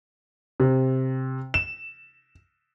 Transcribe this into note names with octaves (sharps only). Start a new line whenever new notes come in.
C3
E7